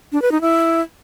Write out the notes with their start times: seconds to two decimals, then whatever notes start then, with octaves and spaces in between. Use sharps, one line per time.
0.12 D4
0.22 B4
0.32 D#4
0.41 E4